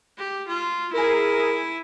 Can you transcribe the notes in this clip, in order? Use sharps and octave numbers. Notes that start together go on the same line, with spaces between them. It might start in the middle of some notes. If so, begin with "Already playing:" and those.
G4
F4
E4 G#4 A#4 G#5